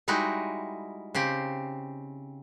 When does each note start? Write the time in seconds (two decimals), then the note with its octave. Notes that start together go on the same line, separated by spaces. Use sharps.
0.08 G3 G#3 D#4 E4 F#4
1.15 C#3 C4 G4